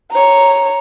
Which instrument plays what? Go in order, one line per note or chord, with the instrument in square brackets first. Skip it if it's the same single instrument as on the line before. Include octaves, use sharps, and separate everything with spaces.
[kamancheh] C#5 A#5